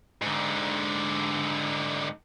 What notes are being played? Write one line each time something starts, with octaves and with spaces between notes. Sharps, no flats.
G#2 D3